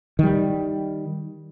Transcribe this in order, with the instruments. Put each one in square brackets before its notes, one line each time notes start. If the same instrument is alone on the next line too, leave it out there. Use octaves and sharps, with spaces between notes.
[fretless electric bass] D#3 G3